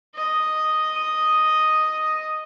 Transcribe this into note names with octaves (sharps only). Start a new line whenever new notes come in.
D#5 D#6